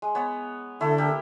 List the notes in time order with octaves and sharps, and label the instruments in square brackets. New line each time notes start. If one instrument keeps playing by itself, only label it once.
[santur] G#3
B3 C#5
[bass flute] D3 [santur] A3 E4 A4
[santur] A#3 G4